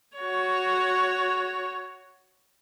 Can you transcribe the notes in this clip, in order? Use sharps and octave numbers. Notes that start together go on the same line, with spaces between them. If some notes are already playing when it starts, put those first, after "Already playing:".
F#4 C#5